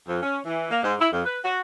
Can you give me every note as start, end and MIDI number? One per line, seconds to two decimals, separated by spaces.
0.06 0.22 41
0.22 0.38 61
0.45 0.69 52
0.70 0.80 58
0.82 0.94 44
0.99 1.07 64
1.11 1.24 41
1.25 1.38 71
1.43 1.58 66